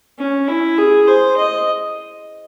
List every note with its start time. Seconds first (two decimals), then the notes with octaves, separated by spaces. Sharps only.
0.19 C#4
0.48 E4
0.78 G#4
1.08 C5
1.37 D#5